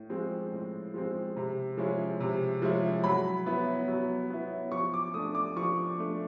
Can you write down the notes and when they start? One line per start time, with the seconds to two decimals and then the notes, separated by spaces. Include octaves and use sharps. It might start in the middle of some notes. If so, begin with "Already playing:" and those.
Already playing: A2
0.10 F3 G#3 C4
0.52 A2
0.94 F3 G#3 C4
1.36 C3
1.77 F3 G#3 C#4 E4
2.20 C3
2.62 F3 G#3 C#4 E4
3.04 F#3 B5
3.46 B3 E4
3.88 F#3
4.30 B3 E4
4.72 F3 C#6
4.94 D6
5.14 A3 D4 D#6
5.35 D6
5.56 F3 C#6
5.98 A3 D4